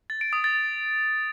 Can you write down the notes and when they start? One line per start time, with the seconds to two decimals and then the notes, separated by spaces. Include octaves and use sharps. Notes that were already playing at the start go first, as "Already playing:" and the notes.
0.10 A6
0.21 D7
0.33 D#6
0.44 A6